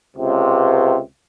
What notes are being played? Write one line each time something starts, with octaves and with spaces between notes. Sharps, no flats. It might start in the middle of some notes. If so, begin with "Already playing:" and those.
C#2 C3